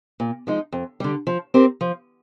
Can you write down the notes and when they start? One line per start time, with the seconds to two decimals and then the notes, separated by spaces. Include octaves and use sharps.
0.20 A#2
0.47 F3 G#3 D#4
0.72 F2
1.00 D3 G3
1.27 F3
1.54 C4 G4 A#4
1.81 F3